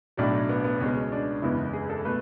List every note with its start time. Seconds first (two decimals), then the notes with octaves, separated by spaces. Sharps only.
0.17 B1 A2 F#3 D4
0.49 B3
0.64 B3
0.80 C#2 B2 G#3 B3 C#4
1.12 D4
1.42 F#1 E2 C#3 G#3 B3 E4
1.73 G#4
1.90 A4
2.05 B2 A3 B4